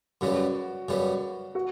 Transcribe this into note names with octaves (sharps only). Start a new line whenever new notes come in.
F#2 C#3 G3 B3 F#4
F#2 C#3 G3 B3
F#4